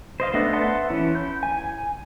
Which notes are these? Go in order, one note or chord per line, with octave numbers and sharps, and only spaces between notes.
C5 D#5 F5
A3 B3 D4 D#5
B4 E5 F#5 A5 C6
E3 C#4 E4
G6
G#5